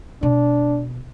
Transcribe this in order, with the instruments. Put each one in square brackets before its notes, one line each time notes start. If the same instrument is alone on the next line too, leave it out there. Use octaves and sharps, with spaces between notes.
[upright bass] B2 [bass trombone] D4